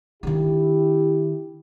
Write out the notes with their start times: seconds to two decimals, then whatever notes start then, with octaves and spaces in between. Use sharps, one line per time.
0.23 D#3 D4 E4 G4